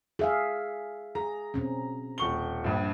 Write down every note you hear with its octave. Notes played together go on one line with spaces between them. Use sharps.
G#4 E5 F5
G#4 A#5
B2 C4 C#4
D#1 C#6 G7
A#1 G2